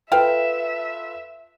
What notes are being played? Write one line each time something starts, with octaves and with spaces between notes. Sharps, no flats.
F4 A4 B4 E5 F5 G5